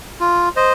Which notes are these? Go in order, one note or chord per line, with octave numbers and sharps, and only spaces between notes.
F4
C5 D#5